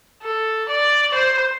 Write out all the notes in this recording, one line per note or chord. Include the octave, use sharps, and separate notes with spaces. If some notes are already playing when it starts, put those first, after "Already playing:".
A4
D5
C5